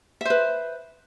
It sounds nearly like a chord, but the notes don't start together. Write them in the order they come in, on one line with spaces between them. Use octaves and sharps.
E5 C5 B4